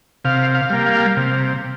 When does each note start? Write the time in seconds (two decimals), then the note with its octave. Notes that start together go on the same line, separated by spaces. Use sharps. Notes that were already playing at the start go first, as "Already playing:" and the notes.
0.25 C3 F5
0.55 F5
0.70 G3 A#3
0.86 F5
1.17 C3